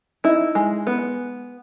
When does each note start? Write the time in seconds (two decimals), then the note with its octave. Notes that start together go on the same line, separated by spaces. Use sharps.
0.24 D#4 E4
0.55 G#3
0.87 B3